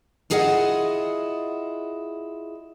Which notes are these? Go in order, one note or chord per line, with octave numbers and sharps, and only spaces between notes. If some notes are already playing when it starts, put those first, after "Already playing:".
E4 F4 G#4 D#5 F5 F#5